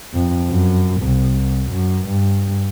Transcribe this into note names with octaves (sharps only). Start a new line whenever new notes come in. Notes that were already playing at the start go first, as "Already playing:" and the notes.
F2
F#2
C2
F#2
G2